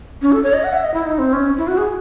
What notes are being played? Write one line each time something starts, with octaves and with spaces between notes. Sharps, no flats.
C#4
A4
C#5
D#5
F#5
E5
D#5
E4
D#4
C4
C#4
E4
F#4
G#4